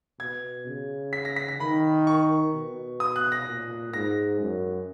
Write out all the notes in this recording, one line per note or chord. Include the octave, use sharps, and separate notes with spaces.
B2 G#6
C#3
B6
A#6
B6
A#6
D#3 B5
C#6
B2
D#6
F#6
A#6
A#2
G#2 A#6
F#2